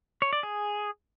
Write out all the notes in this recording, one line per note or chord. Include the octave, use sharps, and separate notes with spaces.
C#5
D5
G#4